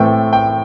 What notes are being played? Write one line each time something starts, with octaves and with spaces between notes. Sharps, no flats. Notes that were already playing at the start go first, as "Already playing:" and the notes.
Already playing: A2 E3 A3 C4 G5
G5